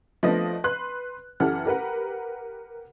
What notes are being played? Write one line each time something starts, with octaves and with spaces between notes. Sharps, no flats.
F3 A3 B3 D4 D#5
B4 C6 F#6
F#2 E3 G4 A4 F#5 F6
G4 A#4 B4 F#5